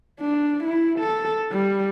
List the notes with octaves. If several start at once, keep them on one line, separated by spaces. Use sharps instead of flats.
D4
E4
A4
G3